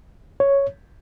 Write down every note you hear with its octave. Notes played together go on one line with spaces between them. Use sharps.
C#5